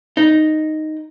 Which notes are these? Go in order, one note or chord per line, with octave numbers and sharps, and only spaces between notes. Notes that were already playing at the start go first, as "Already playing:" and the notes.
D#4